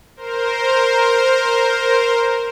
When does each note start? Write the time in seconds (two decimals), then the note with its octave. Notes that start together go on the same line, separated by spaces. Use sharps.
0.16 A#4 C5